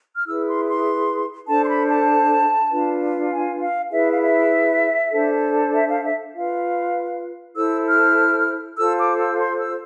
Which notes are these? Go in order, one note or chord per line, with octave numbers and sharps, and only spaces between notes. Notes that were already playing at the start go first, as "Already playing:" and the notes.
F6
E4 G#4 B4 E6
C6
C6
D4 A4 C5 A5
C6
B5
A5
D4 F4 B4
G#5
F5
E4 G#4 B4 E5
F5
E5
D4 A4 C5
E5
F5
E5
F4 B4 F5
E4 A4 C5 E6
F6
F4 A4 C5 E6
D6
E6
C6
E6